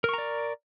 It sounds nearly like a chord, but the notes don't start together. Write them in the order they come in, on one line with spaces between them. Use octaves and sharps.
A#4 C#6 A#5 D5